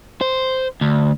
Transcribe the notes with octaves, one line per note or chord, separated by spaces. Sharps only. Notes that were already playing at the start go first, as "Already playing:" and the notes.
C5
D2